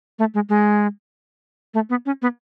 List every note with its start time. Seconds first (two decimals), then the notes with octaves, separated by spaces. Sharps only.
0.19 A3
0.34 G#3
0.49 G#3
1.74 A3
1.90 B3
2.06 C#4
2.22 B3